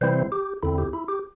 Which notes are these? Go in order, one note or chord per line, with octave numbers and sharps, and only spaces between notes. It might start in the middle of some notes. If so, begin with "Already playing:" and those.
C3 E3 G3 C4 E4 C5
G4
E2 D3 C4 E4
G4
E4
G4